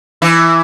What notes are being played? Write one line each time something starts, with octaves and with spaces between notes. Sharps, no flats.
E3 E4